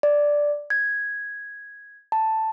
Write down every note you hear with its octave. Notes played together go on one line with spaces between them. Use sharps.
D5
G#6
A5